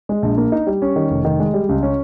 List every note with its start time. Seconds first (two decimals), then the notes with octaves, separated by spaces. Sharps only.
0.09 G#3
0.23 A#1
0.38 A#3
0.52 D#4
0.67 G3
0.82 C#4
0.96 D#3
1.10 F1
1.25 D#3
1.40 G#3
1.54 G3
1.69 C#2
1.83 C#4